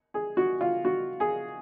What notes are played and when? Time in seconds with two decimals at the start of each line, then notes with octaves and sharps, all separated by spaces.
0.14 G#4
0.37 F#4
0.61 F4
0.85 F#4
1.20 G#4